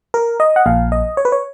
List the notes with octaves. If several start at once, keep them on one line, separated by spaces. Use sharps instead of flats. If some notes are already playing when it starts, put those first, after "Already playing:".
A#4
D#5
F#5
A#1 A#2 F5
D#5
C#5
B4
C#5